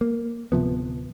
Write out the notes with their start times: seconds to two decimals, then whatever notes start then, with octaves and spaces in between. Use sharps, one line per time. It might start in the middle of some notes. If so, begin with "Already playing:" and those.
0.01 A#3
0.52 D1 C3 F3 B3